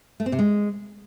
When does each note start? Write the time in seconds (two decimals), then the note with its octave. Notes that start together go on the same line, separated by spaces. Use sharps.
0.20 A3
0.26 C4
0.32 C3
0.39 G#3